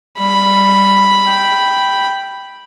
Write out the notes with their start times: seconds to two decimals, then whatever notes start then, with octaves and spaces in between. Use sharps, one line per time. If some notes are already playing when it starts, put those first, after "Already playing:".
0.20 G3 B5
1.27 G5